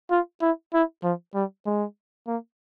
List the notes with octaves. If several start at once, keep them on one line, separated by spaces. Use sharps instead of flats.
F4
E4
E4
F3
G3
G#3
A#3